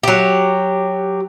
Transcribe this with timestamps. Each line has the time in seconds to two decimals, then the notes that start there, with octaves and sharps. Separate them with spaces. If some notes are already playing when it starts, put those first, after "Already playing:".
0.03 F#3 G4